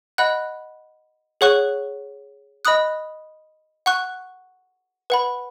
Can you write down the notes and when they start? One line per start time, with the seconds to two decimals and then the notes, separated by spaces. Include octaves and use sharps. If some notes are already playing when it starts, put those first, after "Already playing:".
0.18 D#5 F#5 B5 F#6
1.41 G#4 C#5 F#5 C#6 F#6
2.65 D#5 B5 D#6 F#6
3.86 F#5 C#6 F#6
5.10 B4 F#5 B5